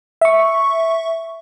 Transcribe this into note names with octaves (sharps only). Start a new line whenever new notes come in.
E5 C#6